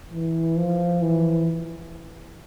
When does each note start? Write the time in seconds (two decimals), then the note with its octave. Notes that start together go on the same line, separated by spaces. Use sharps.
0.11 E3
0.57 F3
1.02 E3